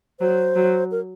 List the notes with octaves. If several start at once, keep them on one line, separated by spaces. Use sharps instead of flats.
F#3 C5
F#3
A#4